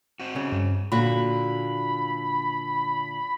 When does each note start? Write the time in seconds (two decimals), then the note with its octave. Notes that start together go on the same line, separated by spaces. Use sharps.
0.20 C4 F#4
0.36 C#3
0.52 G2
0.92 A#2 D3 F#4 B5